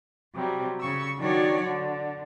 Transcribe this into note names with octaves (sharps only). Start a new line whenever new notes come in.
C3 F#3 G3
C#3 C#6 E6
D#3 F#3 D4 F#4 C#5 D5
D3